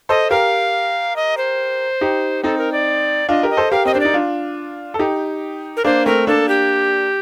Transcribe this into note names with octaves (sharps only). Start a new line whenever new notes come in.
A4 C5 D#5
G4 A#4 F5
D#5
C5
D#4 G4
C4 D#4 A4
A#4
D5
D4 F4 D#5
G4 A#4
D#5
A4 C5
G4 A#4 F5
C4 D#5
D4 C5
D#4 D5
D4 F4
A4
D#4 G4
A#4
A#3 D4 C5
A3 C4 A#4
A#3 D4 A4
G4